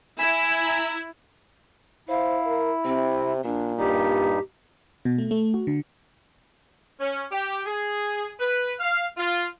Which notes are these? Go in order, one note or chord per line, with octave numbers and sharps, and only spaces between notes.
E4 G#5 B5 E7
A#5
E4 C5 F5
A#4
C3 C4
A#2 D4
G2 G3 D#4 G4
B2
A3
A3
F#4
D3
C#4
G4
G#4
B4
F5
F4